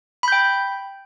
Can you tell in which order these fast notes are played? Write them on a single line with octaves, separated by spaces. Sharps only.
B5 G6 G5